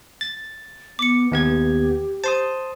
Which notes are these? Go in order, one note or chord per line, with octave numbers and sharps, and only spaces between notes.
A6
B3 D6 C#7
D#2 B3 G4 G#6
C5 A5 C6 D#6